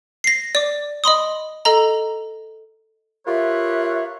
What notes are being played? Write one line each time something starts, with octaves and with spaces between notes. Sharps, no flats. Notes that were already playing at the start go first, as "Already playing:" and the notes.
A#6 C7
D5 D6
D#5 B5 C6 D#6
A4 D#5 A#5
F4 G4 A#4 B4 C#5 E5